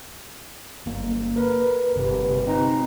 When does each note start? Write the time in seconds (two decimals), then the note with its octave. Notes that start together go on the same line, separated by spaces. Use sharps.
0.86 G1 A#3
1.36 A#4 B4
1.97 G1 C3 G4 B4
2.46 C4 D#4 A#5